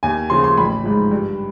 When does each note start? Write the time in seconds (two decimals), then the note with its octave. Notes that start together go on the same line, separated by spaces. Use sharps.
0.03 D#2 G#5
0.30 C#3 F3 C6
0.44 C6
0.58 A1 B5
0.84 G#2 F3
1.12 G2